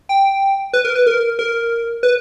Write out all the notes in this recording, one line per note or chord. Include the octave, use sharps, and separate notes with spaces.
G5
B4
A#4
B4
A#4
A#4
B4